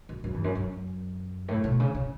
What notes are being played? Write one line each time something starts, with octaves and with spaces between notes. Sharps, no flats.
F#2
F#2
E2
F#2
F#2
A2
B2
C#3
C#3